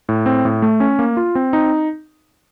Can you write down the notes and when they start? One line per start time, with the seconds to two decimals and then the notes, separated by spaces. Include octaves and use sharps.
0.09 A2
0.26 C4
0.45 A2
0.62 A3
0.80 C#4
0.99 A#3
1.17 F4
1.35 C4
1.53 D#4